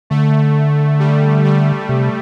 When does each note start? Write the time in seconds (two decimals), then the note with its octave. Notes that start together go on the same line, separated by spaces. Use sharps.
0.10 D3 A3
1.00 G3
1.45 G3
1.89 C3